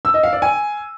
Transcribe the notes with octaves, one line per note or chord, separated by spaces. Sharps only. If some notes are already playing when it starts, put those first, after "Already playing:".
E6
D#5
F5
D5
G#5